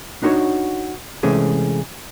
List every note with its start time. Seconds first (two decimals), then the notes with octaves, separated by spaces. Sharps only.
0.22 D4 D#4 F#4 B4 C#5
1.23 C3 E3 G#3 A3 C#4 G#4